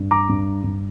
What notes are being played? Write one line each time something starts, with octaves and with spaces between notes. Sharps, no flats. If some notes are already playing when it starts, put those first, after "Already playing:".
Already playing: G2
A#5 D6
G2
G2